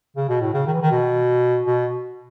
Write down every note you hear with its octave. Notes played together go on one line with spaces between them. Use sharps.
C#3
B2
A2
C#3
D#3
E3
D#3
B2
B2